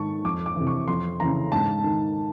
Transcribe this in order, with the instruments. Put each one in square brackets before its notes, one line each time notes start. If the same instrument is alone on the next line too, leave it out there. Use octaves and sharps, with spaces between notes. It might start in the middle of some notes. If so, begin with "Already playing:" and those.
Already playing: [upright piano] G#2 D#3 A5 C#6
F2 D6
D6
C3 E3
C#6
F2 C6
C#3 E3 A#5
G#2 A5
D#3